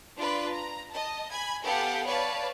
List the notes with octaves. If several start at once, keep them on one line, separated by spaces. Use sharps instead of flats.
D4 F4 B4 D5
A#5
D#5 A5
G#5 B5 G#6
B3 G4 A4 F5 F#5 G#5
B4 C#5 D5 F5 A5